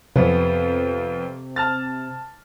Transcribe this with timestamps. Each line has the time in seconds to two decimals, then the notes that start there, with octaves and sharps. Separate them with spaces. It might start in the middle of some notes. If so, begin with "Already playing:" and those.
0.16 F2 C3 B3
1.56 A5 F6 A6